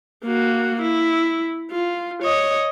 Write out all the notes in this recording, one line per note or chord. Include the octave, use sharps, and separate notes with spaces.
A#3 F#4
E4
F4
C#5 D#5